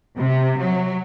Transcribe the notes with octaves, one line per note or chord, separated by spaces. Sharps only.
C3
F#3